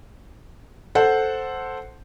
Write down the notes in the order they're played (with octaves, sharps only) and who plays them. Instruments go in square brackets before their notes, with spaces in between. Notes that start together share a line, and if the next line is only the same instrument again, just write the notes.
[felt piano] A4 C5 F#5